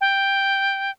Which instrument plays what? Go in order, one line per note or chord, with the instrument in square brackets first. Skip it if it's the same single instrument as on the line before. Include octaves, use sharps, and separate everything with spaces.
[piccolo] G5